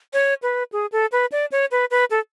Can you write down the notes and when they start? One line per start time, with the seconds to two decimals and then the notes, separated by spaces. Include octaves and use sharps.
0.13 C#5
0.43 B4
0.72 G#4
0.92 A4
1.12 B4
1.32 D5
1.52 C#5
1.71 B4
1.91 B4
2.11 A4